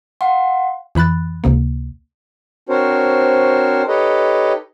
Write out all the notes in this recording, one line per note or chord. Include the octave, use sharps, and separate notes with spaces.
F5 F#5 C6
F2 E3 B5 F#6 A6
C#2 C3 A#3
C4 D4 F#4 A#4 C5 C#5
D#4 G4 A4 B4 C#5 D#5